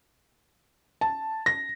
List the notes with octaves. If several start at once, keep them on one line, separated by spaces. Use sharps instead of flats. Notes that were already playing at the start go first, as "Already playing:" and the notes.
A5
A#6